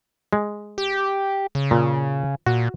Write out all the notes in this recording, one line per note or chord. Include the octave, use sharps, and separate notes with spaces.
G#3
G4
C#3
A#2
A#2 F#4